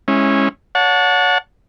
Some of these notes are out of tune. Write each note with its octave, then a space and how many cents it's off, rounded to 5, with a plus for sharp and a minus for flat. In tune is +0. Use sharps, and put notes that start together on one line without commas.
G#3 +0 C#4 -20 E4 -5
C#5 +30 F#5 -30 A5 +0